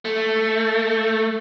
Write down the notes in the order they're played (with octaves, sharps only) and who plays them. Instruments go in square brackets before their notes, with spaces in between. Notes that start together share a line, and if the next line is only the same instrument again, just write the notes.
[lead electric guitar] A3